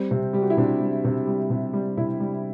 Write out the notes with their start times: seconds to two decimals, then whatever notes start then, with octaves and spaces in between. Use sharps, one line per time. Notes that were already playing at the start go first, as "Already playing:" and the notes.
Already playing: G3 C4
0.11 C3
0.33 G3 G4
0.42 F#4
0.50 E4
0.57 C3 D4
0.81 G3
1.05 C3
1.27 G3
1.50 C3
1.73 G3
1.97 C3 E4
2.20 G3